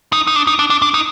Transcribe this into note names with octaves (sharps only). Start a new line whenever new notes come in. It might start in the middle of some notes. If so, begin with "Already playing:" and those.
D#4
D#4
D4
D#4
D4
D4
D4
D#4